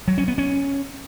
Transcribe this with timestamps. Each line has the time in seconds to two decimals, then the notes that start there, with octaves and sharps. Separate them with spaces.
0.08 F#3
0.18 C#4
0.28 B3
0.38 C#4